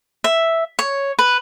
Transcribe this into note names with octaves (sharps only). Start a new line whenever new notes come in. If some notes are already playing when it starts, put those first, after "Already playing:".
E5
C#5
B4